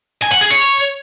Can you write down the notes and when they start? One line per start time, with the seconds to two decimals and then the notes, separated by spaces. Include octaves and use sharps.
0.22 G#5
0.32 F#5
0.41 G#4
0.51 C#5